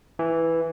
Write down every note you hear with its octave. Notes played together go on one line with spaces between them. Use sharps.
E3